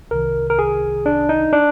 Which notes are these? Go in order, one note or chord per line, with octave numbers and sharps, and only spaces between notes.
C2 C3 D#3 A#4
A#4
G#4
D4
D#4
D4